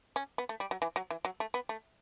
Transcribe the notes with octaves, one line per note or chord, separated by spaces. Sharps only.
C#4
B3
A3
G3
F#3
E3
F#3
E3
F#3
A3
B3
A3